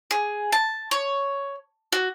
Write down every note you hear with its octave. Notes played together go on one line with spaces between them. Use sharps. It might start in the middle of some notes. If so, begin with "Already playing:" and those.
G#4
A5
C#5
F#4